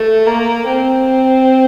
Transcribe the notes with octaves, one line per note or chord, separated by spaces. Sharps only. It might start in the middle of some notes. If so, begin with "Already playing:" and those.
Already playing: A3
A#3
C4